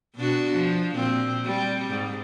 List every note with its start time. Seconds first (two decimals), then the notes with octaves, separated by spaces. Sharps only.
0.16 B2 D4 F#4
0.55 F3
0.95 A#2 C4
1.46 G3
1.90 G#2